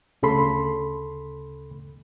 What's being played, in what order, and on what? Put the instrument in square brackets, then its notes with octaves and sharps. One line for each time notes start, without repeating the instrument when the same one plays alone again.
[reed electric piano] D2 C#3 A4 B5 C6